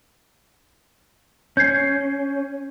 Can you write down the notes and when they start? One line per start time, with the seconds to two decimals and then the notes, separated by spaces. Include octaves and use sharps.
1.57 C#4 G6 G#6 C7